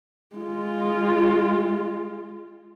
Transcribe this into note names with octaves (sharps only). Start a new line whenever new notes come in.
G#3 F4